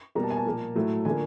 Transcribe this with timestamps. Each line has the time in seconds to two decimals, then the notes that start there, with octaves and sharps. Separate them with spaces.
0.15 B2 G3 A#3 A#5
0.23 A5
0.30 G#5
0.37 A5
0.45 A#2 F3 A#3
0.75 A2 F#3 A3
1.05 D3 F3 A#3 G#5